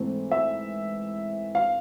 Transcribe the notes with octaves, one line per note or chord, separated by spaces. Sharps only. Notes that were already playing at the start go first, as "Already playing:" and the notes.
Already playing: G#2 E3 A3 C4
E5
F5